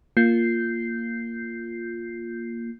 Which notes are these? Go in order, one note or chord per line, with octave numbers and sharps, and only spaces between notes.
A#3 F4 G6 C7